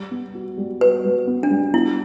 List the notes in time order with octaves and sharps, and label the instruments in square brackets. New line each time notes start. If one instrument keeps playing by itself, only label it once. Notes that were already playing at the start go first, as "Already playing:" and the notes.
Already playing: [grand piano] G3
B3
F#4
G3
[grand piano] F#4 [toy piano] B4
[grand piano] G3
B3
[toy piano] D4
[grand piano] G3
[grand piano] B3 [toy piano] E4